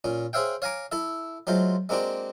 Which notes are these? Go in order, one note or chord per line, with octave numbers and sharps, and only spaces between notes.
A#2 C#4
G#4 C5 C#5 E5 F5 G5
C#5 F5 G#5 A#5 D6
E4 A4 E5
F#3 G#3 A3 F4 C5
G#3 A#3 C4 D4 F#4 G4